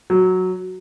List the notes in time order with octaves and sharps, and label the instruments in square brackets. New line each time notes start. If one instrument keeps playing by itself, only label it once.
[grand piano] F#3